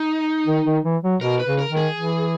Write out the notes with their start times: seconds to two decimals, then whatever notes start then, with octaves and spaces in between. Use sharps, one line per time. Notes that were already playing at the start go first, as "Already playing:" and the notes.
Already playing: D#4
0.47 D#3
0.65 D#3
0.84 E3
1.03 F#3
1.21 B2 A#4
1.39 B4
1.46 C#3
1.59 A#4
1.70 D#3
1.77 G#4
1.96 E3